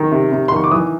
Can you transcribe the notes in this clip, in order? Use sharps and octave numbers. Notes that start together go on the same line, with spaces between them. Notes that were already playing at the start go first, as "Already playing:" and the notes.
Already playing: D#3
C3
C3
C6
D#3 C#6
D6
E3 D#6